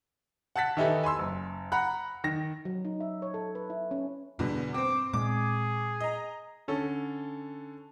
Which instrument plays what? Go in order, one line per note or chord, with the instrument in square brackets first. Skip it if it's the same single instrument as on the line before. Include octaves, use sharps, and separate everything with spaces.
[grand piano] F#5 A5 F#6 A6 B6
D#3 E3 D#4 E4 G4 A4
G#5 B5 C6 E6
F#1
F#5 A#5 B5 F#6
D#3 A#6
[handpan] F#3
D#4
E5
C#5
A4
B4
E4
C#4
[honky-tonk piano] E2 B2 D3 [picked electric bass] G2
[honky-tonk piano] C4 C5 [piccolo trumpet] D6
[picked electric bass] A#2 G#3 C4 [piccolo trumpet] G#4 [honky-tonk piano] D6
[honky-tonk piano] D#5 A#5
[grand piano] D3 C#4 A4